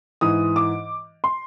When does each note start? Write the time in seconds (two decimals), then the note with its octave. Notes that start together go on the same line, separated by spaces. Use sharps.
0.21 G#2 E3 D#6
0.56 D6
1.24 C6